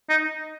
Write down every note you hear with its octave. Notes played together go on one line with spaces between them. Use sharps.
D#4